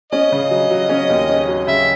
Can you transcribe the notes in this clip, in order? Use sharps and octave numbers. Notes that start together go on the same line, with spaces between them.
C#4 D#5
C#3
F#3
F#3
C#4
D#2
C#4
F#3
C#3 E5